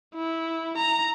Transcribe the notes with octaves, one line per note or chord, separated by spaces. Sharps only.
E4
A#5